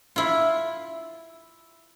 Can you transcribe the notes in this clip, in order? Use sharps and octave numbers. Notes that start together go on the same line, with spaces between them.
E4 F4